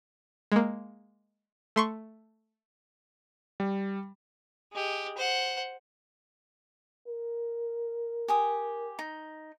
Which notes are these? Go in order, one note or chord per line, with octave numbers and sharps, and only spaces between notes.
G#3 A#3
A3 C6 C#6
G3
G#3 G4
C5 F#5
A#4
G4 G#5 D#6
D#4